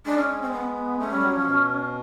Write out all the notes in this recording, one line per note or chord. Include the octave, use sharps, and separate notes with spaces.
G#3 D4
C#4
C#4
C4
B3
A3 C#4
G3
F#3
F3
B2